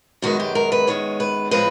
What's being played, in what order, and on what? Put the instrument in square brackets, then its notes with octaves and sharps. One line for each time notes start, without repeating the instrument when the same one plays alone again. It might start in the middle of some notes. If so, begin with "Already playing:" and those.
[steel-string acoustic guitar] F#2 D#3 G#3 B3 F#4
G4
A#4
B4
F#2 D#3 G#3 B3 C#5
B4
A2 F3 G#3 C4 B4